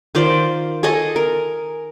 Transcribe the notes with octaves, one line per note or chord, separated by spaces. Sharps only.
D#3 F4 C5 D5
G#4 A4 D#5 G#5
A#4